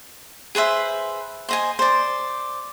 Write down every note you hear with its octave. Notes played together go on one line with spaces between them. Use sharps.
G#4 B4 C5 E5
C5 D#5 G#5
C5 D5